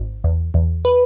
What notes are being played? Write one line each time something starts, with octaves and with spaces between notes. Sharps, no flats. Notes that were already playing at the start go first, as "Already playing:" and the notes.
Already playing: G#1
E2
E2
B4